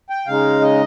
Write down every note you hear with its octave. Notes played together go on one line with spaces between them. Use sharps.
G5
C#3 G#3 D#4 F5
D#5